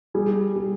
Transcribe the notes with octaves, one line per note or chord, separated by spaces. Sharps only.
G3 G#4
G3